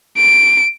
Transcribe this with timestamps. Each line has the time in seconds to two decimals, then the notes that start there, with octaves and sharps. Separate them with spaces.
0.16 D7